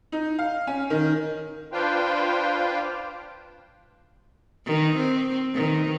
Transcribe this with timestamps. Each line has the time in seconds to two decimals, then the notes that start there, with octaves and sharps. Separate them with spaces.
0.12 D#4
0.39 F5
0.67 C#4
0.90 D#3
1.72 D4 F4 B4 C5 F5 G5
4.66 D#3
4.97 C4
5.55 D#3